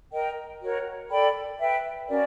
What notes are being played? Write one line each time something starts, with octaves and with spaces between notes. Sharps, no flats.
A#4 D#5 G5
F#4 A#4 C#5
A4 D5 G5 B5
B4 E5 G5
C#4 F#4 A#4 D5